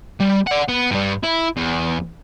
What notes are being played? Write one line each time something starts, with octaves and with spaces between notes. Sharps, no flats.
G3
D5 F#5
B3
G2 G3
E4
E2